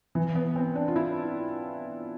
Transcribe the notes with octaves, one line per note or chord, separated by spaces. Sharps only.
E3
B3
C4
D4
F4
E4